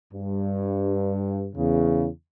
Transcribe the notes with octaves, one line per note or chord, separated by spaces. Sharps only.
G2
E2 C#3